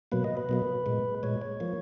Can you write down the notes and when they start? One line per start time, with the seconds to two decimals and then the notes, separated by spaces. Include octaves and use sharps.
0.12 B2 F#3 A#3 B4
0.24 D#5
0.37 B4
0.49 B2 F#3 A#3
0.86 A#2 G#3
1.23 A#2 G#3 C#5
1.42 C#5
1.60 F3 A#3